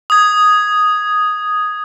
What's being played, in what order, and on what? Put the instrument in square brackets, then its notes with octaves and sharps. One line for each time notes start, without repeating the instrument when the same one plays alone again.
[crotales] D#6 G#6